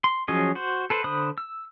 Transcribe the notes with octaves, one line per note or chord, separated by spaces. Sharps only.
C6
F3 F#3 C#4 G#4 D#5
F#4 C5
A4 B4 C5
D3 C5 B5 D#6 F#6
E6